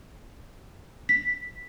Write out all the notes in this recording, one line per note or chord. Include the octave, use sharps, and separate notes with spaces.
B6